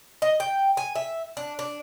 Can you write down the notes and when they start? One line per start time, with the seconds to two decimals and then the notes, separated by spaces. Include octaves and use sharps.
0.22 D#5
0.40 G5
0.77 G#5
0.95 E5
1.37 D4
1.59 D4